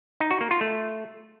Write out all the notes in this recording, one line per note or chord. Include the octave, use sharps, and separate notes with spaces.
D#4
F#4
A#3
F4
A3